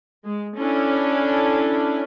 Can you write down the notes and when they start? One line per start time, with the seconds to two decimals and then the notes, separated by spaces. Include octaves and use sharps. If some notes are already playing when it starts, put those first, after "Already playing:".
0.24 G#3
0.58 C#4 D4 E4 A4